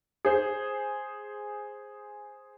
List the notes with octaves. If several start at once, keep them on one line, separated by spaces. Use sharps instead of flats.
G#4 C5